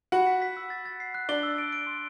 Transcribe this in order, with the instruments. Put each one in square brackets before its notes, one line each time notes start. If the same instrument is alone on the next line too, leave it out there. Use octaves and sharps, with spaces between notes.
[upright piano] F#4 F#5 [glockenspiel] B5
[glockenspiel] B6
B6
E6
A6
A6
C7
F#6
[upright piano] D4 D5 [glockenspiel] G7
[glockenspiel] E6
D7
D7
C6